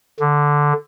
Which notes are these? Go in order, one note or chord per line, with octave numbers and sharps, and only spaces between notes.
D3